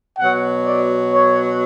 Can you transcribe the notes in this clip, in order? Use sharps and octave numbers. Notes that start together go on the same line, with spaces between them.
B2 F#3 F#5
D5
C#5